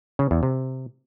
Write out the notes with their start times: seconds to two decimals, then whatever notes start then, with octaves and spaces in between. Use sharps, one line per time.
0.19 C#3
0.31 E2
0.43 C3